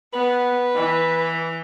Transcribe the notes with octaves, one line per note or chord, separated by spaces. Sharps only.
B3 B4
E3